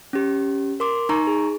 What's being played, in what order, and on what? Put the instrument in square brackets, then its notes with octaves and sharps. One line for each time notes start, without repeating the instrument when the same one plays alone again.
[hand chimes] C#4 G4
A#4 C6 D6
D#4 A#5 C#6
G#4